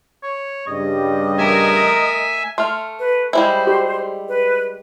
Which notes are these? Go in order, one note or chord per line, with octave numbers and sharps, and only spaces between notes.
C#5
G2 C#3 G3 D#5
A3 A#4 E5 G#5
A3 C6 F6
B4
G3 G#3 E4 C5
F#4 G4
B4